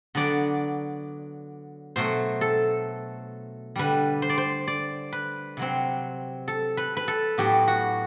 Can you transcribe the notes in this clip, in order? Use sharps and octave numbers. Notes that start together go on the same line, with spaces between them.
D3 F#3 B3 D5
B2 F#3 A3 C5
A4
D3 G3 D4 B4
C5
D5
C5
D5
B4
C3 F#3 C4
A4
B4
B4
A4
A2 F#3 B3 G4
F#4